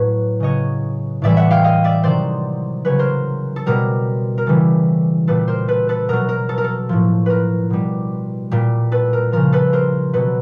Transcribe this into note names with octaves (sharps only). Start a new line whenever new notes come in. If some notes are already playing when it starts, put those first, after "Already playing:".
Already playing: A2 F#3 B4 C#5
C#3 F#3 C#5 D#5
A2 E3 G3 D5 E5
E5 F#5
F5 G5
D#5 F5
D5 E5
C3 D#3 F#3 C5 D5
C#3 F#3 B4 C#5
A#4 C5
A4
B2 G3 A#4
A#4
C#3 E3 G3 A4
A#2 G3 A4 B4
A#4 C5
A4 B4
A4 B4
B2 F#3 A#4
A#4
A4
A#4
A4
A2 F3
A#4 B4
B2 G3
A#2 G3
A4 B4
A#4
C#3 F3 A#4
A4 B4
A#4 C5
B2 F#3 A4 B4